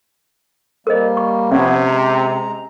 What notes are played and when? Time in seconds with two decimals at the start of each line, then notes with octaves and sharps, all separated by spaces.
0.87 G3 A#3 A#4 C5 D#5
1.17 C#6
1.51 C3 F3 B3 C#4 C#5 E5
1.85 G#3 A#5